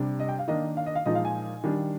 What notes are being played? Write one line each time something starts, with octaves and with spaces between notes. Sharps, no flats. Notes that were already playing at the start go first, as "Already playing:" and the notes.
Already playing: C3 G3 D4
D#5
G5
F5
D#3 A#3 D4 D#5
F5
D#5
F5
A#2 F3 G#3 D#4 D#5
F5
G#5
D#3 G3 D4